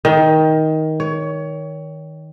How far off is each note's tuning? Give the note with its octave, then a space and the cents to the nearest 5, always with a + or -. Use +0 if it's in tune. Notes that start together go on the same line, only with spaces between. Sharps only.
D#3 +15
C#5 +25